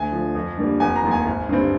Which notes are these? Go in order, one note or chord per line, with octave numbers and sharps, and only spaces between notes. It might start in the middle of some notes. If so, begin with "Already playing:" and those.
Already playing: D2 G#5
D3 F3
F2
D3 G3 A#3
F1 G#5
A#5
D#2 D#3
G#5
G#1
G2 D3 G3 C4